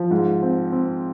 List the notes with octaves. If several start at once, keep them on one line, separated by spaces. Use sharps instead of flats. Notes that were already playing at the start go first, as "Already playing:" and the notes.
Already playing: F3
G#2
C4
C4